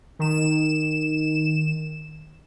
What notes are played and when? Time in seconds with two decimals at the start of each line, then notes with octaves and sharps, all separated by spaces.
0.19 D#3 E7